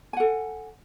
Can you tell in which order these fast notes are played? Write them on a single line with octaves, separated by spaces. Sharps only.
G#5 F#5 A4